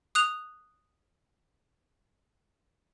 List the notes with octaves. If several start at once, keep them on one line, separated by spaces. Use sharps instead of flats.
D#6 F#6 F7